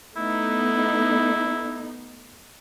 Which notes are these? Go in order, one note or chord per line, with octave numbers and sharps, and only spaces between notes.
A3 B3 D#4 E4